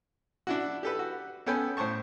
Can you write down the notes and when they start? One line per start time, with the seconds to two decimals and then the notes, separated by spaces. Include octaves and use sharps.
0.47 D4 E4 F#4
0.83 G4 A4 B4
0.99 F#4
1.46 B3 C#4 A4 G5 G#5 B5
1.77 A2 C5 A5 C#6